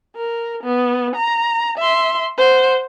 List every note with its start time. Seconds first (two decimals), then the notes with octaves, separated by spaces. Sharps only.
0.16 A#4
0.63 B3
1.16 A#5
1.78 E5 C6
2.38 C5 F#5